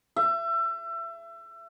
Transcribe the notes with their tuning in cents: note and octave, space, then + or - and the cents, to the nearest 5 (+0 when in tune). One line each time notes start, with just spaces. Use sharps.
E5 +30